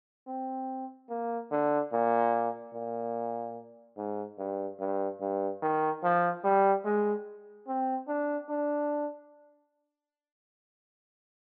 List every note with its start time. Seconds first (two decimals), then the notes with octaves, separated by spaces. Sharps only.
0.27 C4
1.10 A#3
1.51 D3
1.92 A#2
2.74 A#2
3.97 G#2
4.38 G2
4.79 G2
5.20 G2
5.62 D#3
6.03 F3
6.44 G3
6.85 G#3
7.67 C4
8.08 D4
8.49 D4